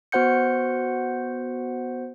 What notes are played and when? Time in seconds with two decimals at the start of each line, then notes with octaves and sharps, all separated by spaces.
0.12 B3 F#4 C5 F#5 G6 C#7